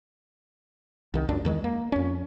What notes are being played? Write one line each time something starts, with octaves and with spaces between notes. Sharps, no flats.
C2 D#3
C#2 F#2 D4
E2 D#3 G#3
A#3
F2 C#4